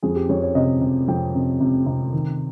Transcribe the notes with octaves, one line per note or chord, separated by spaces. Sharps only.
F2 G#4
G4
F2 C#5
C#5
C3 D#5
C3
F2 G5
C3
C3
C3
D#3